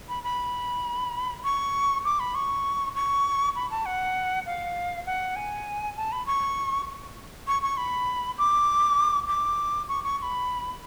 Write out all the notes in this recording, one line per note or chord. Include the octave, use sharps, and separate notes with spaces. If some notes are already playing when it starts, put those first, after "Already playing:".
B5
B5
C#6
D6
B5
C#6
C#6
B5
A5
F#5
F5
F#5
G#5
A5
B5
C#6
C#6
C#6
B5
D6
D6
C#6
C#6
C#6
B5